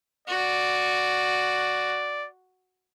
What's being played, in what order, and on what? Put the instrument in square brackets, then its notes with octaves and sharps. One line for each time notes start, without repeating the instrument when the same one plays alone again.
[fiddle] F#4 [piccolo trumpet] D5